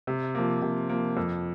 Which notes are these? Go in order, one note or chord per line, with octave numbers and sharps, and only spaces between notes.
C3
F3 A#3
C3
F3 A#3
F2